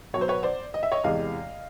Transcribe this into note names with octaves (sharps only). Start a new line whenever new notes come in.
B2 F#3 C5 C#5
B4 C#5
C5 D5
D#5
E5
C#5 D#5
E2 C3 E3 G#3 D#5 F5